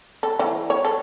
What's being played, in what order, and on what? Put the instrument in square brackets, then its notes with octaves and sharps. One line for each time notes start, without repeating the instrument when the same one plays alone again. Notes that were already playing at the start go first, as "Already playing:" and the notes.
[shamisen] A4
E3
C#5
A4